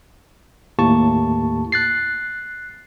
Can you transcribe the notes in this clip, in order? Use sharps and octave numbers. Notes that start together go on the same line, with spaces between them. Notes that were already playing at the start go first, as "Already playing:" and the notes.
D#2 A2 A#3 G4 A5 C#6
F#6 A6 C7